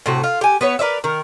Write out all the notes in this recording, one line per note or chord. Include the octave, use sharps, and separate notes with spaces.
A2 C3 F#4
F4
G4 G#5
B3 B4 C#5
A#4 B4 D5 E5
D#3 A#4